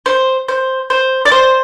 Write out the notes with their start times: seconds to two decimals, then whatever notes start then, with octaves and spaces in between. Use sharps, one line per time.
0.06 C5
0.48 C5
0.90 C5
1.25 D5
1.32 C5